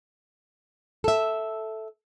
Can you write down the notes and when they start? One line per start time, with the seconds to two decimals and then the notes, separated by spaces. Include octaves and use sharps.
1.04 A4 E5